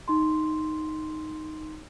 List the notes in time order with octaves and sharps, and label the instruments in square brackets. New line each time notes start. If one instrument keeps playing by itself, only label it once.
[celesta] D#4 C6